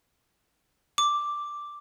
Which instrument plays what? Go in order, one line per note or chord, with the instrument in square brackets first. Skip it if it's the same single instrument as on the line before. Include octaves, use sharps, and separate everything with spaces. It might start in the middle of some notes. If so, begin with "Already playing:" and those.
[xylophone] D6